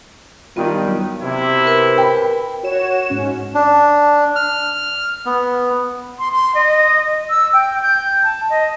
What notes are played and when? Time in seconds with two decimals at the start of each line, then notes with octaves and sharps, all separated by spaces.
0.57 G2 D#3 G3 B3 F4
0.86 F#3
1.22 C3 E4
1.64 A#4 B4
1.98 G5 B5
2.63 F#4 C#5 E7
3.10 G#2 C#4
3.55 D4
4.36 F6
5.26 B3
6.19 C6
6.32 C6
6.55 D#5
7.30 E6
7.53 G5
7.82 G6
8.23 A5
8.50 D#5